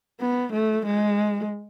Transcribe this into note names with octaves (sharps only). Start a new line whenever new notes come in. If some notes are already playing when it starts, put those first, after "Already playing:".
B3
A3
G#3